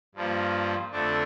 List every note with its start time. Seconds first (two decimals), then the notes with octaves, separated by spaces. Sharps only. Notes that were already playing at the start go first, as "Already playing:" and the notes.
0.15 G2 F3 A#3
0.90 F2 D3 A3 D4